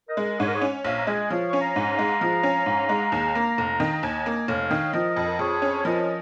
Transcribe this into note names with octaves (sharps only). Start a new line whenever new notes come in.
A#4 D#5
G#3
G#2 C#5
A#4
G#4 C#5
C#4
A#1 C#5 F5
A#5
G#3 D#5 G#5
F3 C#5 F5
C#4 C#6
F5 A#5
G#2
F5 A#5
G#3
F3
C#4
G#2
G#3
D#2
A#3
F1
D#3
A#5
D#2 D#5 G#5
A#3
F1 C#5 F5
D#3
F3 A#4 D#5
F2
A#4
F2 G#4 C#5
C#4
F3 A#4 D#5